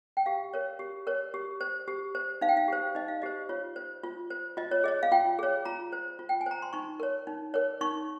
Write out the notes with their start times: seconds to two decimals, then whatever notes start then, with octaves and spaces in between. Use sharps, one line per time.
0.17 G5
0.26 G4 F5
0.54 A#4 C#5
0.79 G4
1.07 A#4 C#5
1.34 G4
1.61 C5
1.88 G4
2.15 C5
2.41 D#4 F5
2.49 G5
2.57 F5
2.68 G4 C5
2.95 D#4 D#5
3.08 F5
3.22 G4 C5 D#5
3.49 F4 C#5
3.76 C5
4.04 F4
4.30 C5
4.57 F4 D#5
4.71 C#5
4.84 G#4 C#5 D#5
5.03 F5
5.12 F4 G5
5.39 G#4 C#5
5.65 F4 A#5
5.93 C5
6.19 F4
6.29 G5
6.41 G#5
6.46 C5 A#5
6.62 C6
6.73 D#4 C#6
7.00 A#4 C#5
7.27 D#4
7.54 A#4 C#5
7.81 D#4 C#6